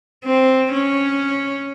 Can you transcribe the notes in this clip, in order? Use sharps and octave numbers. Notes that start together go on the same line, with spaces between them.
C4
C#4